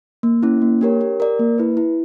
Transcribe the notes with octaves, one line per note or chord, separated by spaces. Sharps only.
A#3
C#4 E4
A#3
D4 G4 A#4 C#5
G4
A#4 D5
A#3
E4 B4
E4